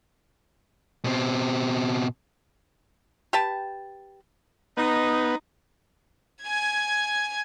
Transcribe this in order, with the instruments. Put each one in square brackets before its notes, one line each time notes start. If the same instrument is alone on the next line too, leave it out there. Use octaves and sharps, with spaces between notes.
[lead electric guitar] B2 C4
[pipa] G4 B4 G5 A5
[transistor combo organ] B3 [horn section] D#4
[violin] G#5 G#6